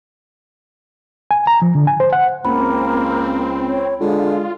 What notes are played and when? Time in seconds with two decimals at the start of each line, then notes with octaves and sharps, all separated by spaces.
1.31 G#5
1.47 A#5
1.62 F3
1.75 D3
1.87 G#5
2.00 C5
2.13 F#5
2.45 C#2 A#3 C4 B5
3.68 C#5
4.01 D3 G#3 F4